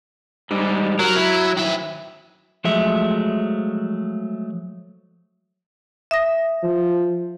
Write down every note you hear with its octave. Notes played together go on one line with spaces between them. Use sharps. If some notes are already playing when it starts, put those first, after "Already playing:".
G#2 G3
F#3 A#4
E4
D#3 E5
F3 F#3 G#3 A3 E5
E5 D#6 A#6
F3